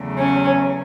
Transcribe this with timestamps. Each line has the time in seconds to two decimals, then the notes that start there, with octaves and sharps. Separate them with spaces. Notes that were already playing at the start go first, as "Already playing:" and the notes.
Already playing: E2 C#3 F#3 A3
0.18 C#4